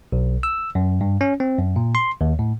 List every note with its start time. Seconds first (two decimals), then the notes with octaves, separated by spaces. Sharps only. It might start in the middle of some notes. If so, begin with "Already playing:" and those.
0.12 B1
0.43 E6
0.75 F#2
1.01 G2
1.21 C#4
1.40 C4
1.59 F#2
1.76 A#2
1.95 C6
2.21 D#2
2.39 A2